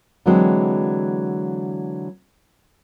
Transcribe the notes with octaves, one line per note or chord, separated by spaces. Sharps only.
D3 E3 F#3 G#3 C4